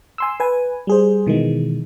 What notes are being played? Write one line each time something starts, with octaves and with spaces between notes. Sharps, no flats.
G#5 C6 E6
B4 G#5
G3 G#4 C5
B2 D#3 E3 G#3